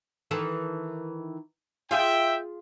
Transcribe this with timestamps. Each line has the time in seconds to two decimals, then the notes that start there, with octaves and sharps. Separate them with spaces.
0.31 D#3 E3 A4
1.91 F4 G#4 E5 G5